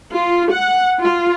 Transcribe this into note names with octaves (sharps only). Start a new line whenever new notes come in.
F4
F#5
F4